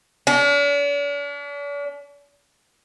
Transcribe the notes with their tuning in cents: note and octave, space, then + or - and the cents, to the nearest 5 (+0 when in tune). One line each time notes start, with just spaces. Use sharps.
D4 -45